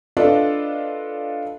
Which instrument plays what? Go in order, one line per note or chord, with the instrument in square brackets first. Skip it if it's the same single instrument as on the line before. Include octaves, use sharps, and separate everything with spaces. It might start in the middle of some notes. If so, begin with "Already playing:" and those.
[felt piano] D4 F4 A4 B4 D5 D#5